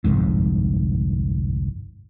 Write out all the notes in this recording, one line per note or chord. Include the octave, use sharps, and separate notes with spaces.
G1 C2 F2 G#2